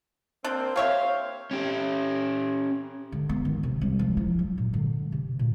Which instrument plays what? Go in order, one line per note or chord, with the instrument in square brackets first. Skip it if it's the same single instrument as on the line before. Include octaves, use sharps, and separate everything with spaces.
[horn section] A#3 C4 [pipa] D4
[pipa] A#3 C#5 E5 [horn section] G4 C5 F5
[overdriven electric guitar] C#4 G4
[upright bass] D3
B3
D#3
C3
C2
F3
E4
F#3
A#2
D3
C3
A#2